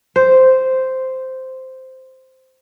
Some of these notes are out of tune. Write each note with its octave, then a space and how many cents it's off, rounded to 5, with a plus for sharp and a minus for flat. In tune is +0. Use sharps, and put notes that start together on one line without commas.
C5 -5